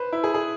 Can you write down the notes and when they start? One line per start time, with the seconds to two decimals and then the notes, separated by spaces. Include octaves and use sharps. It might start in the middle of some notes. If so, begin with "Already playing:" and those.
Already playing: B4 C5
0.13 E4
0.24 G#4
0.34 G#4